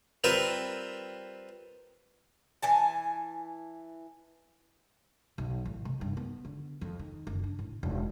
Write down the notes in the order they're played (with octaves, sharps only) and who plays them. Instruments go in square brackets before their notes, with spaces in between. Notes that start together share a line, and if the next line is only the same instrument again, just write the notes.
[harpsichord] G3 C4 F4 A#4 B4 E5
[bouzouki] E3 G#5 A5
[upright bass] B1
A1
C3
G2
B3
D3
F2
D#3
F#1
D4
A2
E1